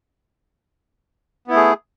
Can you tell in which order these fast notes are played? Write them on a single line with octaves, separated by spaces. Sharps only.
B3 E4 A3 G#4